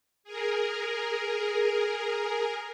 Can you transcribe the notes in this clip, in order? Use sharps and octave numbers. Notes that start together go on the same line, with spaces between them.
G#4 A#4